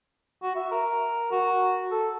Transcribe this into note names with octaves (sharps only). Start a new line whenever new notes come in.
F#4
E5
A#4
F#4
A4